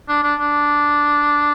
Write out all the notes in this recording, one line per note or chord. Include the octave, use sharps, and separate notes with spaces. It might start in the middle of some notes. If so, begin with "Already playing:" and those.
D4
D4
D4